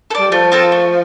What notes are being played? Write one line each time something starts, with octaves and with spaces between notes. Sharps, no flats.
A4
G3 D5
F3 A3
C4 F4 A4
A3